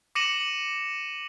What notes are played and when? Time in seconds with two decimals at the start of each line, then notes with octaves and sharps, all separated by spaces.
0.15 D6 A#6 C#7 D#7 E7 F#7